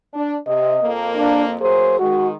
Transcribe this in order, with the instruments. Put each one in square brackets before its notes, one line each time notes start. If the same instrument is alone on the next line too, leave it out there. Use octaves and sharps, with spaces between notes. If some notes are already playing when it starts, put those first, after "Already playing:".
[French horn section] D4
[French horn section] C3 [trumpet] D#5
[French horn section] F2 A#3
[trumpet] D4
[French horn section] F#3 A#3 G#4 [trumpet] C5
[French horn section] D#3 G#3 [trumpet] F#4